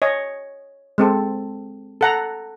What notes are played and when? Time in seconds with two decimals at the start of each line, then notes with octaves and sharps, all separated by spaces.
0.02 C#5 D#5 G#5
0.98 G#3 C4 A4
2.01 A4 F#5 A#5